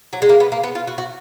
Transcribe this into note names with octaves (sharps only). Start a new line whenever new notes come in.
F#3
G#3
A#3
B3
A#3
B3
F4
F#4
F#4